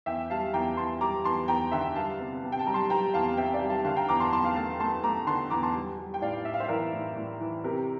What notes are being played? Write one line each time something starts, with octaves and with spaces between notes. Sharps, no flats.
E2 E5 G5
G3 F5 A5
E2 G5 A#5
E2 A5 C6
G3 A#5 D6
E2 A5 C6
E2 G5 A#5
D3 E5 G5
G3 F5 A5
C3
C3
G5
A5
G3 A#5
A5 C6
G3 G5 A#5
E2 F5 A5
C4 E5 G5
D5 F5
G3
F5 A5
D3 F5 A5
G5 A#5
E2 A#5 D6
A5 C6
E2 A5 C6
F5 A5
A3 F5 A5
A3 A5 C6
A3 A#5 D6
D3 A5 C6
E2 A#5 D6
A5 C6
G3
G3
G5
A2 D5 F5
A2 E5
F5
C5 E5
E3 A#4 D5
A2
A2
E3
C3 G4 A#4